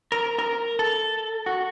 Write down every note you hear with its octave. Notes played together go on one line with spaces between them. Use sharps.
A#4
A#4
A4
F#4